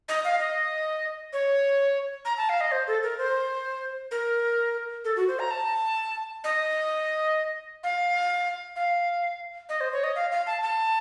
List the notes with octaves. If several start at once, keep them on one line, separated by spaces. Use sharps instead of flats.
D#5
F5
D#5
C#5
A#5
A5
F5
D#5
C5
A4
A#4
C5
A#4
A4
F#4
C5
A#5
A5
D#5
F5
F5
D#5
C5
C#5
D#5
F5
F5
A5
A5